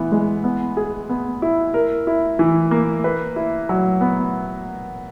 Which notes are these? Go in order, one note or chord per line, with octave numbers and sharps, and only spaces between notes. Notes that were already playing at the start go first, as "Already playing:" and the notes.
Already playing: E3 B3
G#3
B3
G#4
B3
E4
A#4
E4
E3
A#3
B4
E4
F#3
B3